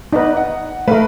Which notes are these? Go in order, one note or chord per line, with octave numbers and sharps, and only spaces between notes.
B3 D#4 B4 D5
F#5
A3 A#4 B4 F5